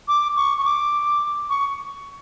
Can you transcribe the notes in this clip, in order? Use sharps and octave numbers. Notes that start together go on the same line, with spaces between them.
D6
C#6
C#6
D6
C#6